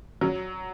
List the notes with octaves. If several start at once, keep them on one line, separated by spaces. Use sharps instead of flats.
F#3